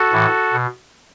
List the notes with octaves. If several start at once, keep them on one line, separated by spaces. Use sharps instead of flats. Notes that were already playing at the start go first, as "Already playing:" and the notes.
Already playing: F#4 A4
A2 E3
B2